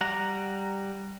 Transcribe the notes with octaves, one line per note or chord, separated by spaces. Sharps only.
G3 F#5 A#5